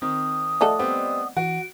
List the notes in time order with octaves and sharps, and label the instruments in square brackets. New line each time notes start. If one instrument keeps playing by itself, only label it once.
[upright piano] D#3 [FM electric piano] C4 [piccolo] D#6
[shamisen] F3 A3 A4 [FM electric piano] D5 D#5 F#5
[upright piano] G3 B3 C4
[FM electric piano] E3 [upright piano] F#4 [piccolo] D7